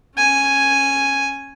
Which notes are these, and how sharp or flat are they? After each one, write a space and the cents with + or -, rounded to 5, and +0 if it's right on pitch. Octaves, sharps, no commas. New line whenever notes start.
C#4 -15 G#5 +0